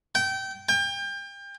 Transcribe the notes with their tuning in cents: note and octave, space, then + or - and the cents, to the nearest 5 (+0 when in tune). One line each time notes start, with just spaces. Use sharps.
G5 -25
G5 +30